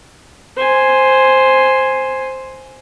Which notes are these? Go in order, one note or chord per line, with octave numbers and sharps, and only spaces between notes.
C5 G#5